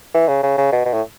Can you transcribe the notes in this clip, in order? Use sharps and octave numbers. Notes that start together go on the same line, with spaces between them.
E3
C#3
C#3
C#3
B2
B2
A2